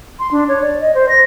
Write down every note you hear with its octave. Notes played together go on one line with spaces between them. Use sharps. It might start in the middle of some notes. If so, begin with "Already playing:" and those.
C6
D4
C#5
D5
D#5
C5
A#6